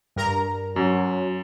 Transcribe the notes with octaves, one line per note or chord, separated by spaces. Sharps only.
G2 A#4 A#5
F#2 F#3